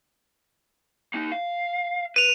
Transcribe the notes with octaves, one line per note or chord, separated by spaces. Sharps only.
A#3 D#4
F5
B4 D#7 F7